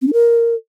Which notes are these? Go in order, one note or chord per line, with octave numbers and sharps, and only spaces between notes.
C4
D4
A#4